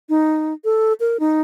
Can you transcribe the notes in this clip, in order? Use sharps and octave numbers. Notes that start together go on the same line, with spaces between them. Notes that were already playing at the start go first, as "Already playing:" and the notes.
D#4
A4
A#4
D#4